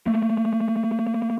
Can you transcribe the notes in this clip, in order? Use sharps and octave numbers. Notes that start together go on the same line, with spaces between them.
A3 A#3